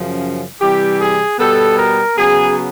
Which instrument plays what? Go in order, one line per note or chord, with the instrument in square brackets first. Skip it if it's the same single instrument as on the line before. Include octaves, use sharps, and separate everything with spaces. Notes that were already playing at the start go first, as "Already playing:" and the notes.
Already playing: [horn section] F#2 C#3 F3
C3 E3 G3 G4
G#4
B2 G3 B3 A4
A#4
C#3 F#3 B3 G#4